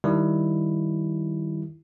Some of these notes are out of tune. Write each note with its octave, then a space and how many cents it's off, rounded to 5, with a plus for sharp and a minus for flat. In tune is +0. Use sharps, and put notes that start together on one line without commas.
D#3 +0 G3 -5 E4 +0